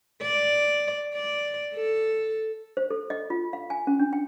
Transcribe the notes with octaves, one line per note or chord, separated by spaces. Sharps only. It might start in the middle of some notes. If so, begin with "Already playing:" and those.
D5
D5
A4
C5
A4
D#5
F4
F5
G#5
C#4
D4
G5